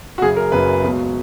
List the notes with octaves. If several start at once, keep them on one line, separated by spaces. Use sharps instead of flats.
F#4
F#1 F#2 C#3 G#4
A#4
F#1 F#2 C#3 B4
C#2 B2 F#3